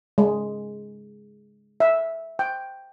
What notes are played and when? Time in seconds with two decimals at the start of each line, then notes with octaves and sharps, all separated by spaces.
0.18 G#3
1.80 E5
2.39 G5